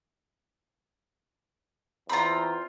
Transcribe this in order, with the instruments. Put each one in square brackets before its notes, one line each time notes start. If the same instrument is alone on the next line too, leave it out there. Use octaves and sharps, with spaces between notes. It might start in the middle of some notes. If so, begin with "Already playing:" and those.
[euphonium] E2 [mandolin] C4 F4 [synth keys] A#5 B5